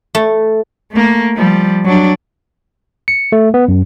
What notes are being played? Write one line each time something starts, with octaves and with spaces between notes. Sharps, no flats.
A3
A3 A#3
F3 G3
F#3 D4
C#7
A3
B3
F#2